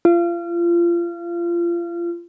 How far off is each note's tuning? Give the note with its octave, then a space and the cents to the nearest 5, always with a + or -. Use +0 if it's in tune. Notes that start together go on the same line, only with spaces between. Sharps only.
F4 -30